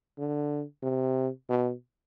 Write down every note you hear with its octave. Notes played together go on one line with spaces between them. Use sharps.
D3
C3
B2